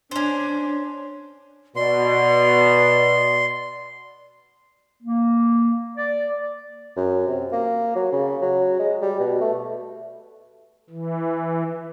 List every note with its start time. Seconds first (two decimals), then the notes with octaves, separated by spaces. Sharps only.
0.11 C#4 D4 C5
1.76 B2 D5 C6
5.02 A#3
5.97 D5
6.97 F#2
7.27 C3
7.52 A#3
7.95 F#3
8.12 C#3
8.42 F#3
8.79 G#3
9.02 G3
9.19 B2
9.41 A3
10.90 E3